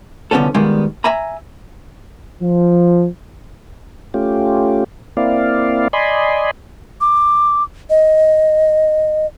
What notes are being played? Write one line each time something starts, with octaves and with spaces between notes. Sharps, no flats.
C2 D3 F3 B3 C#4 A4
A#2 D#3 G3 G#3 A#3 B3
E5 G#5 A#5 B5
F3
A3 C#4 F4 G4
A#3 C4 E4 D5 F5
D5 D#5 G#5 B5 C6
D6
D#5